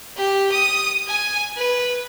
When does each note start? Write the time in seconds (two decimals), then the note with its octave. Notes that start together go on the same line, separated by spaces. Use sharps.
0.17 G4
0.52 D#6
1.08 G#5
1.57 B4